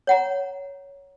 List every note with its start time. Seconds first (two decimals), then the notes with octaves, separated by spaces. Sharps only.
0.07 C#5 F#5 A#5